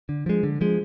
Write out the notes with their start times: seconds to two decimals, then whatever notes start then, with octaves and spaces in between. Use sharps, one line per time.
0.09 D3
0.26 F3 G#3
0.43 D3
0.61 F3 G#3